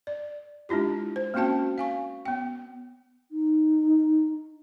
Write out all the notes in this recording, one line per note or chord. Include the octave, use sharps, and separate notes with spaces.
D5
G#3 D4 E4 F4 G4
C5
A#3 C4 C#4 F#4 G5 A5
F5 G#5 C#6
B3 G5
D#4